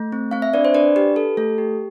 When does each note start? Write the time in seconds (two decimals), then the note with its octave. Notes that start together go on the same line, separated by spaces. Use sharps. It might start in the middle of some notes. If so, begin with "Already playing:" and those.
Already playing: A3
0.12 C4
0.31 C4 F5
0.42 E5
0.53 D4 B4 D5
0.65 C5
0.74 D4 B4 D5
0.96 G4 B4
1.16 G4 A4
1.37 A3 A4
1.58 G4